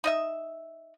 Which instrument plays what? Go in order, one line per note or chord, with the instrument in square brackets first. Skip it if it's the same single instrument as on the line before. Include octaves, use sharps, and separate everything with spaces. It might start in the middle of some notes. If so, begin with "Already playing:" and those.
[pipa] D#4 D#5 E5